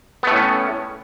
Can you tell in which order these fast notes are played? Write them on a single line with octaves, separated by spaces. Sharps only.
B3 A3 A2 C#4